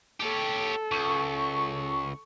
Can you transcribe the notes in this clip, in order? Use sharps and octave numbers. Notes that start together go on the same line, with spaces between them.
G4 A4 C#5
C#2 C#6